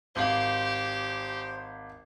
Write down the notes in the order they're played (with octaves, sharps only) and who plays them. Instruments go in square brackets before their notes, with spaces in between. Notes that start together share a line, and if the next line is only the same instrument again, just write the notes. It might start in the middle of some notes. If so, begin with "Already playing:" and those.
[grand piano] G#1 F5 F#7 [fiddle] G4 [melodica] C5